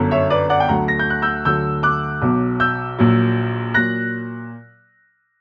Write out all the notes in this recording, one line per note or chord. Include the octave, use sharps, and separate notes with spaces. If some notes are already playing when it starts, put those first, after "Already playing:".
Already playing: G1 F#2 D3
C#5 E5
B4 D5
D5 F#5
G5
D2 D3 F#3 F#5 A#5
A#6
G6
F#6
E6 G6
D2 D3 F#3 E6 G6
D6 F#6
B1 B2 F#3
E6 G6
A#1 A#2 F#3
A#2 F#3 F#6 A#6